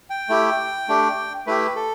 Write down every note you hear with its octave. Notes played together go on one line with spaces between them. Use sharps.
G5
A3 E4 G4
A3 D4 G4
A3 E4 G4 B4
A4